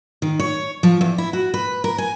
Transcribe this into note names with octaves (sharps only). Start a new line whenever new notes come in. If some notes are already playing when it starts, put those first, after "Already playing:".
D#3
C#5
F3
E2
E4
F#4
B4
A#4
G#5